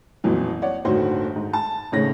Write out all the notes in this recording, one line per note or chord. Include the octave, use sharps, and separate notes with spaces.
A1 F2 A#2 E3 F#3
C#5 D5 F#5
G1 D#2 A2 F#4 C5
G#2
A5
G#1 A2 C#3 C#5 A#6